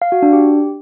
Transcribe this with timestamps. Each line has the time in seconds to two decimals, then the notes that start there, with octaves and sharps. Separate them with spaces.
0.02 F5
0.12 F#4
0.22 D4
0.33 G4